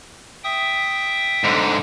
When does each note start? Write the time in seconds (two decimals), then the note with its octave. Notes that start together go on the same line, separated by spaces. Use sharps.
0.44 E5 G5 D#6
1.44 G#2 D3